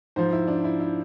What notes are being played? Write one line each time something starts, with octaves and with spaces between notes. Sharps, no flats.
G#2 F3 C5
E4
D4
E4
E4